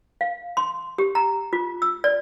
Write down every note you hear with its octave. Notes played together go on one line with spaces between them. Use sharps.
F5
C6
G4
A#5
F4
E6
D5